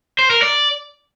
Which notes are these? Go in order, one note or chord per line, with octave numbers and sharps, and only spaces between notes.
C5
A#4
D5